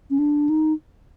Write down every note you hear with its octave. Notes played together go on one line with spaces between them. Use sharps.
C#4
D4
D#4